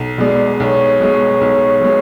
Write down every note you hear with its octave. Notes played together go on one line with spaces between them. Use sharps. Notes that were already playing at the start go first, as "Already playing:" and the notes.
Already playing: B1
B2 G#3 D5
B1 C#5
B2 G#3
B1
B2 G#3